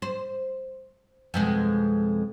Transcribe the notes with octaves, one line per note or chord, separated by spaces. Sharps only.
C5
F2 B2 G#3